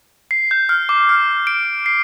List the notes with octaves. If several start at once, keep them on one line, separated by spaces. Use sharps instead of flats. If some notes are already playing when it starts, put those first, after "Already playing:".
C7
G6
F6
D6
F6
D7
C7